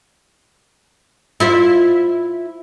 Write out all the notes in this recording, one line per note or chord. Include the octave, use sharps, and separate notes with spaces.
E4 F4 C5